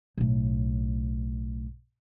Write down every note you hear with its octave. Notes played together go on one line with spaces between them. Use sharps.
B1 A2